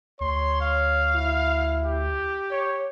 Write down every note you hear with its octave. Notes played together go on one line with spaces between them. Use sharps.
D2 C#5 C6
F5
E4
G4
C#5